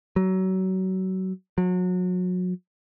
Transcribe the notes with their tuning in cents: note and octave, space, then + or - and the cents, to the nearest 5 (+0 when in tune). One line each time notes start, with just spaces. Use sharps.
F#3 +25
F#3 -30